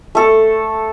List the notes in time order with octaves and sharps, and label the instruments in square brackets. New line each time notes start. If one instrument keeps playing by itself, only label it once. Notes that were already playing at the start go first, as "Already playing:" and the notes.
[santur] A3 A4